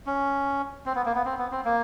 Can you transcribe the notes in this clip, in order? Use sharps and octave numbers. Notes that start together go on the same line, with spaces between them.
C#4
C4
B3
A#3
B3
C4
B3
C4
A#3